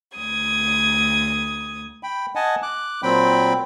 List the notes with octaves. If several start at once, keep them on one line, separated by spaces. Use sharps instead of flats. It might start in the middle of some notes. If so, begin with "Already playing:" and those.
D2 D#6 G#6
G5 B5
D#5 F#5 G#5 A5
D6 F#6
A#2 F#3 C4 G5 B5